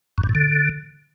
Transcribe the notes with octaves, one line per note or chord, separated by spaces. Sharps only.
F#2
G2
A2
D3